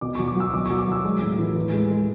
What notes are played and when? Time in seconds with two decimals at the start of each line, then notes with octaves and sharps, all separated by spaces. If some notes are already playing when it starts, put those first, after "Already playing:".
0.01 B2 D6
0.15 C#6
0.19 F#3
0.28 D6
0.36 F#3 E6
0.54 B2 D6
0.66 C#6
0.70 F#3
0.79 D6
0.88 F#3 E6
1.05 G#3
1.22 A2
1.39 E3
1.56 A2
1.73 G#3
1.90 G#3